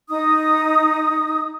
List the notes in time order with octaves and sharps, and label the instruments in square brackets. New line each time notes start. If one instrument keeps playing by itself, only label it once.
[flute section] D#4 D#6